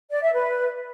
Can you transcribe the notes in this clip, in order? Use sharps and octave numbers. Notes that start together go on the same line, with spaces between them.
D5
E5
B4